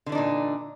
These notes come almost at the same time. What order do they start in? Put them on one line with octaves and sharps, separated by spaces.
D3 E3 D4 D#4 A#2